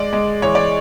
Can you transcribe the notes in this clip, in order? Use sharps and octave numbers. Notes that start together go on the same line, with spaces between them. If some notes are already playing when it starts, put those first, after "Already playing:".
Already playing: G#3 D5
G#3
E3 C#5
D5